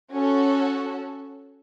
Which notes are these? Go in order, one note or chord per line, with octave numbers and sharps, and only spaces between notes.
C#4 F#4 A4